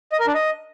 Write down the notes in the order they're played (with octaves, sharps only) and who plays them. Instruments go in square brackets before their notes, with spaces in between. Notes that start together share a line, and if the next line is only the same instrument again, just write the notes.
[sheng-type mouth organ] D#5
A#4
D4
D#5